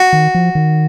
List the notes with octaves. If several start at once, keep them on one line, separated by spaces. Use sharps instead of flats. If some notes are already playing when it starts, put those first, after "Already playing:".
Already playing: F#4
D#3
F3
D#3